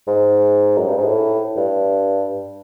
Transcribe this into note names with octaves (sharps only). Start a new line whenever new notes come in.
G#2
F#2
G2
G#2
A2
G2